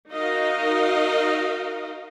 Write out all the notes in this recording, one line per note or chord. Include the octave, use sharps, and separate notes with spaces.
D#4 F#4 A#4 D#5 F5